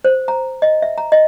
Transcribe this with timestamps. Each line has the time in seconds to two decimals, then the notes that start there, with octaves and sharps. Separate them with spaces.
0.05 C5
0.28 A#5
0.62 D#5
0.82 E5
0.98 A#5
1.12 D#5